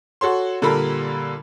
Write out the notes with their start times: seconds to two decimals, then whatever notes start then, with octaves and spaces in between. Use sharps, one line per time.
0.21 F#4 A4 C#5 C6
0.62 A#2 D3 G3 A4 A#4 B5